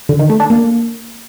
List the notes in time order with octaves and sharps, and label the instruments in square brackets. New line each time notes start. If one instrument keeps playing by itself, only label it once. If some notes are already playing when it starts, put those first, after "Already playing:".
[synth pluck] D3
D#3
A3
D4
A#3